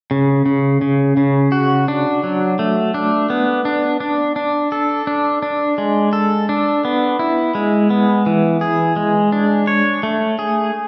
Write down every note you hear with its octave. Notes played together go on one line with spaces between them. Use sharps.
C#3
C#3
C#3
C#3
F#4
D4
F#3
A3
D4
B3
D4
D4
D4
A4
D4
D4
G#3
A4
D4
B3
E4
G#3
B3
E3
G#4
G#3
D4
C#5
A3
G#4